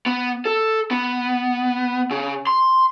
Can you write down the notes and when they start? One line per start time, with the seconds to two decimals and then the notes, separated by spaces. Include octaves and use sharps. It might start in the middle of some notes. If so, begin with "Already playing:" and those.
0.06 B3
0.45 A4
0.91 B3
2.11 C#3
2.47 C6